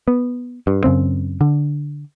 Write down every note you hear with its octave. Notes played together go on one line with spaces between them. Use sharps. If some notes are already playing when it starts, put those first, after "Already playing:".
B3
G2
F#2 C#3 C4
D3